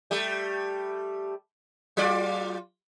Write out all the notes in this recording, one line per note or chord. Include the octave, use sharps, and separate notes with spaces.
G3 A3
F#3 F4 D5